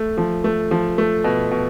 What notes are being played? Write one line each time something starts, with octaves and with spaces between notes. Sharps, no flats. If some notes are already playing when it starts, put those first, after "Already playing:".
Already playing: A3
F3
A3
F3
A3
B2
B2